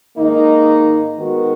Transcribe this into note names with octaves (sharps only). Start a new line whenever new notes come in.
G#2 D#3 A#3 D#4
D#3 G#3 B3 F#4 A#4